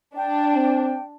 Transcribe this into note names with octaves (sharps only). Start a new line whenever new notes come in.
D4 G5
C4